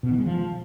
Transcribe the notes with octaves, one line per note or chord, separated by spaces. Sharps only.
B2
D#3
G#3
F3